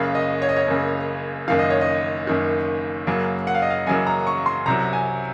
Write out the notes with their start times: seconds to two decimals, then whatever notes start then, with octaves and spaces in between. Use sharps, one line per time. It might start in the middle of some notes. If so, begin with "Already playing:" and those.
Already playing: F#1 F#2 C#3 F5
0.15 D#5
0.42 C#5
0.49 D#5
0.56 C#5
0.68 F#1 F#2 C#3
1.48 F#1 F#2 D#3 F5
1.59 D#5
1.70 C#5
1.81 D#5
2.27 F#1 F#2 D#3
3.07 F#2 C#3 F#3 A#3
3.47 F#5
3.55 F5
3.62 D#5
3.70 F5
3.87 F#2 C#3 F#3 A#3 G#5
4.07 A#5
4.27 C#6
4.46 C6
4.66 C2 C3 F#3 A#5
4.93 G#5